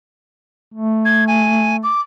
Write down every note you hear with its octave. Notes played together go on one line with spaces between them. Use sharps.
A3
G#6
G#5
D6